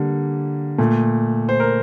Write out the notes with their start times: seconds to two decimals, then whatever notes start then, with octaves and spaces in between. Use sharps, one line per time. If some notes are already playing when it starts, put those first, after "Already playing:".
Already playing: D3 G3 A#3
0.78 A#2 A3
1.49 C5
1.60 A#4